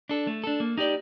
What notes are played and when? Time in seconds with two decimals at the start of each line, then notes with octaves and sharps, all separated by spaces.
0.09 D4 A4
0.27 A3
0.44 D4 A4
0.60 A#3
0.78 D#4 G4 D5